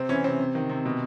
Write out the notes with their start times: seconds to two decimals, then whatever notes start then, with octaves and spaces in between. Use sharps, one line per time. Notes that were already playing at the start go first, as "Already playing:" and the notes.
Already playing: C3 C4
0.09 E3 C#4
0.24 C3 C4
0.40 C3
0.55 D#3
0.69 C3
0.86 B2